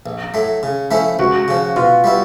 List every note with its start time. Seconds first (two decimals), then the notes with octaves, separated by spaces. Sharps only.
0.06 A#1
0.34 A2 F#3 A3
0.63 C#3
0.91 F3 A3 C#4 E4
1.19 C#2 F#4
1.48 C#3 F3
1.76 B2 F4
2.04 G3 B3 E4